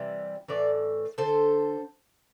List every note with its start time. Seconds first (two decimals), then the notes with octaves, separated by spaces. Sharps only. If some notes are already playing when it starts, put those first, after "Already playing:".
Already playing: C3 E3 G3
0.48 A2 E3 D5
1.18 D3 A4 C5